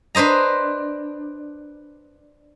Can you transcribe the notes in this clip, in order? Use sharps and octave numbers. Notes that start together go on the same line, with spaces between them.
D4 B4 C5 D#5 A#5